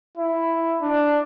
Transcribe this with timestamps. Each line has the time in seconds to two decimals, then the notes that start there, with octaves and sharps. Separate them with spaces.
0.18 E4
0.82 D4